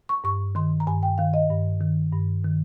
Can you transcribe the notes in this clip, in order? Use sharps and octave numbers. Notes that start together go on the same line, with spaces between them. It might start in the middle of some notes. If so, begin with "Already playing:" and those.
C#6
G2 C#6
D#3 C6
A#5
G2 G#5
G5
D#3 F5
D#5
G2
D#3
G2
D#3